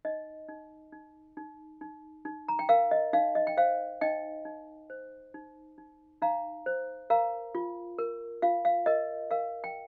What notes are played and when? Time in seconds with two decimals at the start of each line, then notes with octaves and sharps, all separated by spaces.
0.05 D#4 D#5
0.49 D#4
0.93 D#4
1.37 D#4
1.81 D#4
2.25 D#4
2.48 A#5
2.59 G5
2.69 A#4 F5
2.91 D#5
3.13 D#4 F5
3.35 D#5
3.47 G5
3.57 C5 F5
4.01 D#4 D#5 G5
4.45 D#4
4.90 C5
5.34 D#4
5.78 D#4
6.22 D#4 F5 A#5
6.66 C5
7.10 A#4 F5 A#5
7.55 F4
7.98 A#4
8.42 F4 F5
8.65 F5
8.86 A#4 D#5
9.31 A#4 F5
9.64 G5